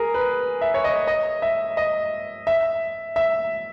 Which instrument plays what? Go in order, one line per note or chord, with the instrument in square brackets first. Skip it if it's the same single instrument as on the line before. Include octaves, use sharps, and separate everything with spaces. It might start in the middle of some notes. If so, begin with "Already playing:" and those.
Already playing: [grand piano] G#4 A#4
B4
E5
C#5
D#5
D#5
E5
D#5
E5
E5